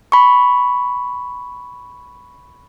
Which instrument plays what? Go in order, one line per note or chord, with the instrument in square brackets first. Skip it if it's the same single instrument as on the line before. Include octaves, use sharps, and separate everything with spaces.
[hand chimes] B5 C#6